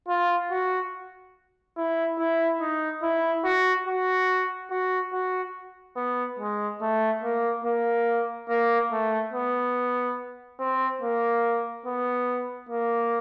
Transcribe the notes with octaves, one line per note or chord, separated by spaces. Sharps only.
F4
F#4
E4
E4
D#4
E4
F#4
F#4
F#4
F#4
B3
G#3
A3
A#3
A#3
A#3
A3
B3
C4
A#3
B3
A#3